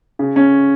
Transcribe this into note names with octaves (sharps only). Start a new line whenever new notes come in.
C#3
C#4